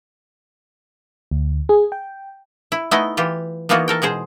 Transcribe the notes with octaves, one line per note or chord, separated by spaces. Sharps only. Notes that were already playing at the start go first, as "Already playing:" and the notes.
D2
G#4
G5
E4
A3 B3 D#4 E4 D#5
E3 F4 G4
E3 A#3 B3 D#4 F4 F#4
A4 A#4 G5
B2 G#3 G#4 C5